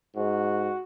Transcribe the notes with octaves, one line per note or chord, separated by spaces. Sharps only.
G#2 F#4